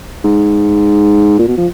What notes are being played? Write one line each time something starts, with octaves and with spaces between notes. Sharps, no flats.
G#2
A#2
B2
F3